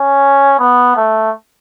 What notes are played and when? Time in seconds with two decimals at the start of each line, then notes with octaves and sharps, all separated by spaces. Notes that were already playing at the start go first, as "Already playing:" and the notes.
Already playing: C#4
0.59 B3
0.96 A3